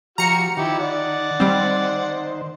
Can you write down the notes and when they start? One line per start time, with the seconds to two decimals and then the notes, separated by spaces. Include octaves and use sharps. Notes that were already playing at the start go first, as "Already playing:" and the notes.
0.18 F3 F#4 G4 A#5 F6 C#7
0.57 D#3 F3 E4 G4
0.79 D5 F#5
1.40 D#3 G3 C4 C5